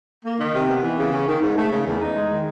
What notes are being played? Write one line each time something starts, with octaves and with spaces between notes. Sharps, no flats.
A#3
D#3
C3
B3
E3
C#3
C#4
D#3
G#2
A3
C#3
E2
D#4
G#3
D#3